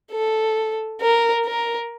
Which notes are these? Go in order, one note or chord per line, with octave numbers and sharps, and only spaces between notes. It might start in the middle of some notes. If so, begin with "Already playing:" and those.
A4
A#4
A#4